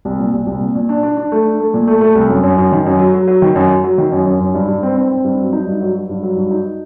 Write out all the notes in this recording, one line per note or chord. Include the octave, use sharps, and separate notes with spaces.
C2
A#2
C2
C2
A#2
A#2
D4
D4
D4
A3
D4
A3
A#2
A3
A3
C2
F#2
F#2
F#2
D#3
F#2
F#3
F#3
F#3
D#3
F#2
F#3
F#3
D#3
F#2
F#2
F#2
G2
G2
C4
C4
C4
G2
F#3
D#4
G2
F#3
F#3
G2
F#3
G2
D#4